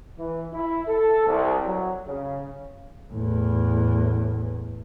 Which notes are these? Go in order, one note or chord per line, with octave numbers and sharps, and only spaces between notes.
E3
E4
A4
C2
F#3
C#3
E2 A2